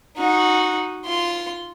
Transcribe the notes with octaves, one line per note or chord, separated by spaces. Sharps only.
D#4 F#4
F4 C6